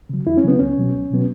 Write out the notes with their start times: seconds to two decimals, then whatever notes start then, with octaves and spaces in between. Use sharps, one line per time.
0.09 C#3 F#3
0.26 E2 E4
0.37 C#4
0.44 C#3 F#3 B3
0.59 C#2 C#4
0.77 B2 F#3 B3
0.94 C#2
1.11 B2 F#3 B3